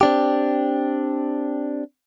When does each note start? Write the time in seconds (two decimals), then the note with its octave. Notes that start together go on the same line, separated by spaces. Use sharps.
0.01 C4 D4 G4